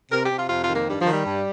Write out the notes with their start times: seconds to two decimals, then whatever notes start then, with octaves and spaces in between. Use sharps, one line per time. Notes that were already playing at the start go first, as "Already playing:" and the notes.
0.11 C3 A#4
0.24 G4
0.30 C3
0.37 F4
0.49 F2 F4
0.63 F4
0.69 D#3
0.75 A#3
0.88 G2 G3
1.00 F3
1.06 D#3
1.12 G3
1.26 G2